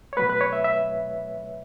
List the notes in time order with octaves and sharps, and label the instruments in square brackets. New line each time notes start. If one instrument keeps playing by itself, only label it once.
[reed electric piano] C#5
B2 F#3 A3 B4
B4
C#5
E5
E5